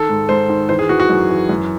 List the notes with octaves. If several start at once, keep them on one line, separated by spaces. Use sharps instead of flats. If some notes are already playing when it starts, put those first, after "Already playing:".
Already playing: D#3 A4
G#2
G#2 C5
D#3
E3 C5
G#4
E3 F#4
F#4
F#2
E3
F#2